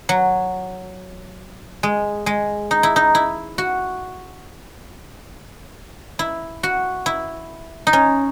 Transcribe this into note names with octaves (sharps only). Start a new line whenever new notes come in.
F#3
G#3
G#3
D#4
E4
D#4
E4
F#4
E4
F#4
E4
D#4
C#4